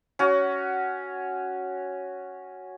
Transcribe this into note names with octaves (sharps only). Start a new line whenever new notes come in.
C#4 F#4